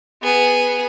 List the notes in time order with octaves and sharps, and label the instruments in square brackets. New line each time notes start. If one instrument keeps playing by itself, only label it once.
[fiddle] B3 G#4